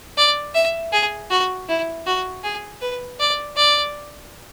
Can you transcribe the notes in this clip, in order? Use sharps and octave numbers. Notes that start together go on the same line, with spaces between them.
D5
E5
G#4
F#4
E4
F#4
G#4
B4
D5
D5